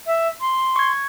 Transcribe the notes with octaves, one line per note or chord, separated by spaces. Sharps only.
E5
C6
C#6 G#6